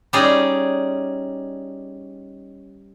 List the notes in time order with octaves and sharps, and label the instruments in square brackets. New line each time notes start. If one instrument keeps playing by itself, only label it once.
[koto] G3 C#4 D#4 G#4 D5